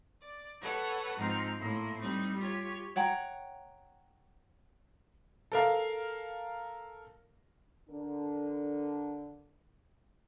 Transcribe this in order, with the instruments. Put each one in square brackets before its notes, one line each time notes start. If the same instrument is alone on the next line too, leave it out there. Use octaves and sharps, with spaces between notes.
[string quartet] D5
A4 B4 C#5 F#5
G#2 F3 C4 D#4 C6 F6
A2 A#3 E4 C6
G3 C4 D#4
F4 G4 C#5
[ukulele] C#5 F#5 G5 A#5
[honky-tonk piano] A4 A#4 F5
[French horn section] D3 D4 A#4